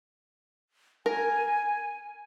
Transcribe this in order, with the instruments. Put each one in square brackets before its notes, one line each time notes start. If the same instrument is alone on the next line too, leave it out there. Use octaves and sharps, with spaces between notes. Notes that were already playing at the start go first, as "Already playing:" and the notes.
[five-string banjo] A#4 [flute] G#5